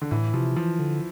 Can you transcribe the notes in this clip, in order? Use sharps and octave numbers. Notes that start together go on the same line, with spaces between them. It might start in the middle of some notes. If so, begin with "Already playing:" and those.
D3
A2 E3
C3 F3
E3 F3
D3